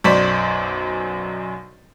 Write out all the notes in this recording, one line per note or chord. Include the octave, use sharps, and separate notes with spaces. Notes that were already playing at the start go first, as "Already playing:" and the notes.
B1 F#2 C5 D5 C#6 B6